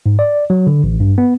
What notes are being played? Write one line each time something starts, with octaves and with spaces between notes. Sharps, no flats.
G#2
D5
F#3
D3
A1
G2
B3